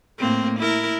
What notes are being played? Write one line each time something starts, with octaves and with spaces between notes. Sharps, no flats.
A2 A#3 C4
E4 A#4